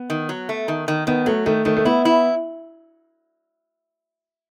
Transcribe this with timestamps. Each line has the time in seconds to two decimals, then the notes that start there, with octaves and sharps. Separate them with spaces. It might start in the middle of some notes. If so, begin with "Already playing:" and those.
Already playing: B3
0.10 D#3
0.29 F#3
0.49 A3
0.68 D#3
0.88 D#3
1.07 D#3 B3
1.26 F#3 A3
1.46 D#3 A3
1.65 D#3 A3
1.77 A3
1.85 B3 E4
2.05 E4